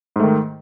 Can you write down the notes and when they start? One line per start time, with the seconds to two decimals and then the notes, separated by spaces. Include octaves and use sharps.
0.16 G#2
0.20 A3
0.23 D#3